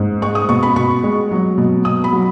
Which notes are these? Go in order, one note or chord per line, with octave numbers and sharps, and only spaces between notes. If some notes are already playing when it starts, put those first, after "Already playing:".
Already playing: G#2
G#3 C#6
D#6
B2 C#6
B5
B2 C#6
G#3
F#3
B2
B2 D#6
B5
F#3